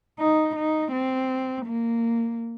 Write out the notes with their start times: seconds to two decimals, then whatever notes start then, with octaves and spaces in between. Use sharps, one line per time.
0.19 D#4
0.56 D#4
0.92 C4
1.66 A#3